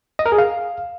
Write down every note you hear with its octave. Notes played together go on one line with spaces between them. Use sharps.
D#5
A#4
G#4
F5